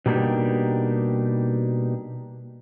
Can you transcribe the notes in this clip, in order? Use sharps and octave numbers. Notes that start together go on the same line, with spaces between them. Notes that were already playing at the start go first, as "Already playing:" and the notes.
B2 G3 A#3 D4 D#4 G4